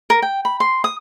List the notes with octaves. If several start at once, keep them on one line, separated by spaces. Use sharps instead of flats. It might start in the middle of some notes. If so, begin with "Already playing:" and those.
A#4
G5
B5
C6
D#6